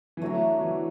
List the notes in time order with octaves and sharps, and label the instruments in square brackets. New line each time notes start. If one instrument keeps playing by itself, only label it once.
[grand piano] E3
[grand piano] F#3 [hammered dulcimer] A3 D4 F#4
[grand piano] E3